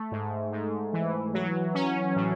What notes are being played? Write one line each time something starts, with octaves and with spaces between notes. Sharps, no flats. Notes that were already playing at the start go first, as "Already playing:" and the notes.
Already playing: A3
G#2
G#2
E3
F#3
C#4
A2